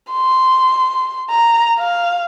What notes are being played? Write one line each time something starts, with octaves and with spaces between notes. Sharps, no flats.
C6
A#5
F5